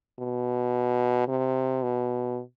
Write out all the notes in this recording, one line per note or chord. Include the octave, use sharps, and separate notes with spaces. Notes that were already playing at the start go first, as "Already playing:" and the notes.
B2
C3
B2